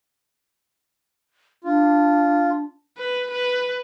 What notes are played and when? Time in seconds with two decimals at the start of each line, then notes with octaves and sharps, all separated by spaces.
1.64 D4 F4
2.98 B4
3.30 B4